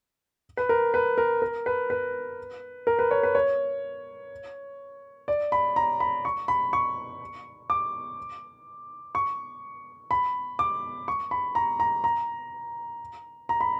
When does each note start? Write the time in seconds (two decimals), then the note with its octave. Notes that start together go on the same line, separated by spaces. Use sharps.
0.57 B4
0.69 A#4
0.94 B4
1.18 A#4
1.42 A#4
1.66 B4
1.90 B4
2.87 A#4
2.99 B4
3.11 C#5
3.23 B4
3.35 C#5
5.28 D5
5.52 B5
5.76 A#5
6.00 B5
6.25 C#6
6.48 B5
6.73 C#6
7.70 D6
9.15 C#6
10.11 B5
10.59 D6
11.08 C#6
11.31 B5
11.55 A#5
11.80 A#5
12.04 A#5
13.49 A#5
13.61 B5